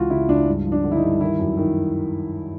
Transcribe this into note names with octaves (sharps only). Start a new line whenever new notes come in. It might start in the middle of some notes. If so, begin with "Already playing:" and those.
Already playing: C#2 E3 F4 F#4
C#3 E4
C#2 D4
G2
F3
D4
D3
E4
D#4
G2
D#3 E4
F#2
D#3